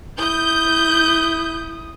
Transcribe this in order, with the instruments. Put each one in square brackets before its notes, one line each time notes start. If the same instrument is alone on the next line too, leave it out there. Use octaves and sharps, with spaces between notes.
[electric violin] E4 D#6 [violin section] G6